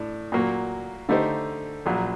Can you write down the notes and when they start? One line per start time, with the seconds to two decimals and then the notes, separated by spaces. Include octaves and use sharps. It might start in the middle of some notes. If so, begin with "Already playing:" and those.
Already playing: A2 D4
0.32 A#2 F#3 A#3 F#4
1.09 D3 A3 D#4 G4 C5
1.86 A#1 A#2 F#3